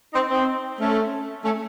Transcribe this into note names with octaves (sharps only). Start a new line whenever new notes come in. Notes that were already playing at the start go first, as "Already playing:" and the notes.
C4 D#4
C4 D#4
A3 C#4
A3 C#4